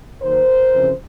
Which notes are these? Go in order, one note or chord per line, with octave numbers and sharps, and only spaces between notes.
D#2 D#3 F#3 A#4 C5
F2 C#3 E3